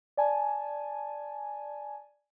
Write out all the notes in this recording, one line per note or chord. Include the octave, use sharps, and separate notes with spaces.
D5 G#5 A5